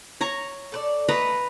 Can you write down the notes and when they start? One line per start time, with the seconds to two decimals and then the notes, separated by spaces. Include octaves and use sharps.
0.21 C#5 A#5 C#6
0.72 A4 B4 D5
1.09 A3 B4 D#5 A#5